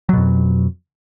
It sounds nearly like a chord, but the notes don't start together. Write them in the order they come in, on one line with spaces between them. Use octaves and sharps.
F#3 B2 F2